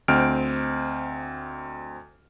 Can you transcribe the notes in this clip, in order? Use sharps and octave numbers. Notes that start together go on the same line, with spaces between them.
D2 C4 D#5 G5 F6 D7